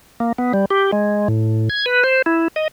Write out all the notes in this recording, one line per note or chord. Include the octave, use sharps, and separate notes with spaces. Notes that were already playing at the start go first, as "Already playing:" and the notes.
A#3
B3
G3
G4
G#3
A2
G#6
B4
C5
E4
D#5